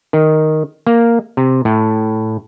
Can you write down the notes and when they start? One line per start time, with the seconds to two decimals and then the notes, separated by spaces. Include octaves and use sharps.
0.13 D#3
0.87 A#3
1.37 C3
1.65 A2